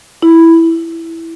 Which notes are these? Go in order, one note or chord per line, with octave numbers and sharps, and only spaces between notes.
E4